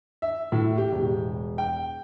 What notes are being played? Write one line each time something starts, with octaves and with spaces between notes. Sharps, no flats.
E5
A2
G4
E1
G5